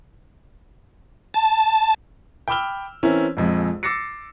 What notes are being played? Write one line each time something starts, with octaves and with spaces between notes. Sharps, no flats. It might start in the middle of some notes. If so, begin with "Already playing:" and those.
A5
G5 B5 D6 E6 F6 G7
E3 C4 C#4 E4 A#4
A#1 F2 G#3
D6 E6 A6 A#6 C7 C#7